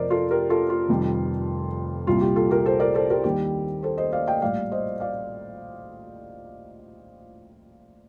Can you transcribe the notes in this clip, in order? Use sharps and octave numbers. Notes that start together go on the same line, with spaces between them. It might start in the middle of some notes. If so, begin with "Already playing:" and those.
Already playing: F2 C3 F3 A#4 C5 D5 D#5
F4 A4
G4 A#4
F4 A4
F4
F1 F2 D#3 G3
C2 A#2 G3 F4
G4
F4 A4
G4 A#4
A4 C5
A#4 D5
A4 C5
G4 A#4
D#2 D#3 G3 G4
A4 C5
C5 D#5
D5 F5
D#5 G5
A#1 A2 G3 D5 F5
C5 D#5
D5 F5